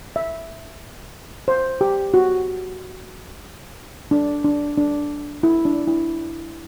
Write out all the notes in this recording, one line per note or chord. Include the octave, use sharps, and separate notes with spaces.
E5
C5
G4
F#4
D4
D4
D4
E4
D4
E4